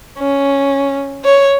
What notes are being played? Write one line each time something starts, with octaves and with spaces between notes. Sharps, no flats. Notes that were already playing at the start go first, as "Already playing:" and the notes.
C#4
C#5